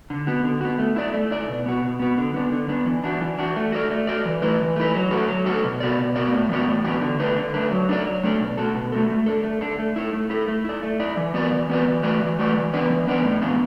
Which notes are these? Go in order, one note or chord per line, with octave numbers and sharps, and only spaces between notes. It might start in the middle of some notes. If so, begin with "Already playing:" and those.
D3
B3 F#4
D3
B3 F#4
A3
E4 D5
A3
E4 D5
B2
B3 F#4
B2
B3 F#4
D3
B3 D4
D3
B3 D4
E3
D4 F#4
E3
D4 F#4
A3
F#4 A4 D5
A3
F#4 A4 D5
E3
A3 E4 B4
E3
A3 E4 B4
F#3
A3 F#4 A4
F#3
A3 F#4 A4
B2
B3 F#4 D5
B2
B3 F#4 D5
A2
E3 B3 F#4 D5
A2
E3 B3 F#4 D5
D3
A3 D4 B4
D3
A3 D4 B4
F#3
A3 D4 A4 D5
F#3
A3 D4 A4 D5
B2
A3 F#4 A4
B2
A3 F#4 A4
A3
D4 A4
A3
D4 A4
A3
E4 A4
A3
E4 A4
A3
E4 D5
A3
E4 D5
E3
B3 F#4 B4 D5
E3
B3 F#4 B4 D5
E3
A3 F#4 B4 D5
E3
A3 F#4 B4 D5
E3
B3 D4 B4 D5
E3
B3 D4 B4 D5
A2
E3 B3 D4